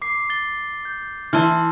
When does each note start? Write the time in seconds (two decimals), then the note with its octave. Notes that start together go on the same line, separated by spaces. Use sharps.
0.02 D6 C7
0.30 A6 G7
0.85 G6
1.33 E3 E4 A5 C6 F6